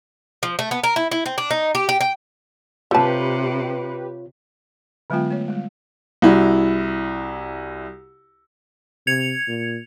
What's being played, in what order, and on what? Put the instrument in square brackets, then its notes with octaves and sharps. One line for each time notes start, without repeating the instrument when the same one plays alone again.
[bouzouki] F3
A3
B3
A#4
E4
E4
C4
D4
D#4
G4
G4
G5
[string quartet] C3 [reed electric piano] F4 C#5 [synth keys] G4 B4 [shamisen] A4 A5
[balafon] D3 F#3 G#3 B3 F4 G5
A3 C#5
G3 G#3
[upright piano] C2 E4 F#4
[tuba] C3 [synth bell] G#6 C#7 F7
[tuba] A#2